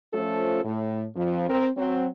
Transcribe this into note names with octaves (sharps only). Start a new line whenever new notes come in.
F3 A3 C#4 F4 A4 C5
A2
F2 F3
C4 A#4
F#3 C4